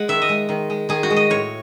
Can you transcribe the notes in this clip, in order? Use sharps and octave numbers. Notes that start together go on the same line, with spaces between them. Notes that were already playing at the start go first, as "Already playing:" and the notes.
Already playing: G#3 F#5
D#3 E5
D#5
G#3
D#3
G#3
D#3 G#4
F#4
G#3
D#5
A2 C#5